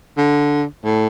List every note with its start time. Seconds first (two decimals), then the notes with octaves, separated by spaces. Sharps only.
0.17 D3
0.84 A2